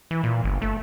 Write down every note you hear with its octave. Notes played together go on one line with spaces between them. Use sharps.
E3
A#2
G1
A3